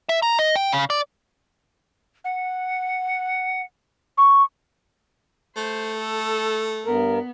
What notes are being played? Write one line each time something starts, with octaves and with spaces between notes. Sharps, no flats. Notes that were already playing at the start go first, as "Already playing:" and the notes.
E5
A#5
D#5
G5
C#3
D5
F#5
C#6
A3 C5
A4
G2 B3 A#4